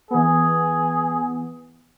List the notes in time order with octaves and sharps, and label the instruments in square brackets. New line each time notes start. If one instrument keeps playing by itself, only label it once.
[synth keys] E3 B3 [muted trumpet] G#4